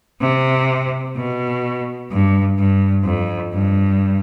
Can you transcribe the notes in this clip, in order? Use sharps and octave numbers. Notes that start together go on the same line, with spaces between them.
C3
B2
G2
G2
F2
G2